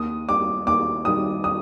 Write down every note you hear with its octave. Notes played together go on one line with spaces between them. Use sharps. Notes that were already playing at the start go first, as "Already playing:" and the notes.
Already playing: D#2 D#6
D#3 G3 D6
D#2 D6
D#3 G3 D#6
D#6